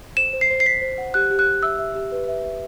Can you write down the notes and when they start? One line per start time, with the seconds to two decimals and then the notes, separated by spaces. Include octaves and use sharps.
0.17 C5 E7
0.33 C5
0.41 C7
0.50 C5
0.60 C7
0.66 C5 B6
0.82 C5
0.98 F#5
1.14 G4 F#6
1.31 G4
1.39 F#6
1.47 G4
1.63 E5 E6
1.79 E5
1.95 G4
2.12 B4
2.28 E5
2.45 E5